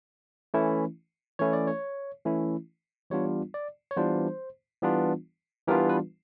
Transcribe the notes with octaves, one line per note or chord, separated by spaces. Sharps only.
E3 A3 C#4 E4
E3 A3 C#4 E4 C#5
D5
C#5
E3 A3 C#4 E4
E3 G3 B3 D4 F4 C#5
D5
C#5
E3 G3 B3 D4 F4 C5
E3 G3 B3 D4 F4
E3 G3 B3 D4 F4 A#4
B4